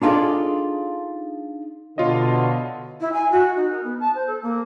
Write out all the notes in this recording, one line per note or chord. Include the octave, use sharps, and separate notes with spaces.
D4 D#4 F4 G#4 A4 D5
B2 D3 F4 C#5 D#5
E4
G#5
F#4
D#4
A#4
B3
A5
C5
A4
A#3